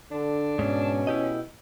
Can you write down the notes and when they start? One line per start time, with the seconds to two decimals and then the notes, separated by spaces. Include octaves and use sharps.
0.11 D3 D4
0.59 G#2 B2 C#4
1.07 E4 G4 D#5